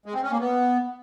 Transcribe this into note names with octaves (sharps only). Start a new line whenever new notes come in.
G#3
C4
C#4
A#3
B3